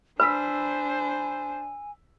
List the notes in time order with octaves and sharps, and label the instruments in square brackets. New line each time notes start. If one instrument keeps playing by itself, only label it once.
[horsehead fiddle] D4 C5 [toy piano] B4 [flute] G#5 [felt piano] B5 E6 B6